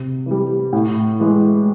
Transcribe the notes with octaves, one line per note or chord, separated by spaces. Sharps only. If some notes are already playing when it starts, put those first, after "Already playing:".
Already playing: C3
E3 G3
A2
E3 G#3